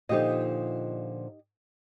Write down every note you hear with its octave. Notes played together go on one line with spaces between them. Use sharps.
A#2 D3 F3 D#4 G4 D#5